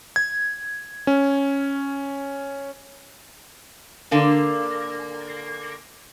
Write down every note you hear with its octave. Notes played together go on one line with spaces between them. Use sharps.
G#6
C#4
D3 A#3 D4